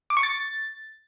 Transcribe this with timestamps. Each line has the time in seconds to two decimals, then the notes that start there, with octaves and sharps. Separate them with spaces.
0.10 D6
0.17 C#6
0.23 A6